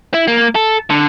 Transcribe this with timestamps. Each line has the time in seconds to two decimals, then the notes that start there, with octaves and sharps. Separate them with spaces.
0.14 E4
0.28 A#3
0.55 A4
0.90 D3